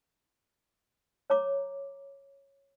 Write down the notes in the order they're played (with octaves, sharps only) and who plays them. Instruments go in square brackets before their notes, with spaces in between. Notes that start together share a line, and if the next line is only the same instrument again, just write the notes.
[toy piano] C#5 A#5 D6